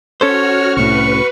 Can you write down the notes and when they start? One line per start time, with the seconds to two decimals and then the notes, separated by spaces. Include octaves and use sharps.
0.21 C#4 F#4 A4 C5 C#5 F6
0.77 C2 A2 B4 C#6